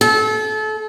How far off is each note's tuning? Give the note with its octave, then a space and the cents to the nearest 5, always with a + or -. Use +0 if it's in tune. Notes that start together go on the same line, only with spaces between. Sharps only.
A4 -30